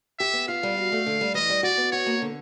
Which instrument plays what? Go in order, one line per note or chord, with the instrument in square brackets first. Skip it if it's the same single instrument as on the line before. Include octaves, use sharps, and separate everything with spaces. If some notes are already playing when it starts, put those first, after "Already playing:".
[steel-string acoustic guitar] G4 [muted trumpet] E5
[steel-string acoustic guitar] B3
[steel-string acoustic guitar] F4 [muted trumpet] F5
[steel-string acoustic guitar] G3
F#4
A3
D3
G3
[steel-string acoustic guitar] E3 [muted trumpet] D#5
[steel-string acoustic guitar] G3
[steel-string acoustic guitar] F#4 [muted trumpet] D5
[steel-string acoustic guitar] B3
[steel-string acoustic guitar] F#4 [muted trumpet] C#5
[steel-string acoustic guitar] A#3
D3